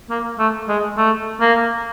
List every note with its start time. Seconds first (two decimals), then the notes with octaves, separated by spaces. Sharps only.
0.10 A#3
0.39 A3
0.68 G#3
0.97 A3
1.41 A#3